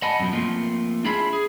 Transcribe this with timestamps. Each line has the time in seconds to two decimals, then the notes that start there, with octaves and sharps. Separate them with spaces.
0.02 D#5 F#5 G#5 A5 B5
0.20 F#2 B2 F3
0.33 F3 A3 A#3 C4
1.05 D4 F4 G#4 E5 B5
1.33 G#4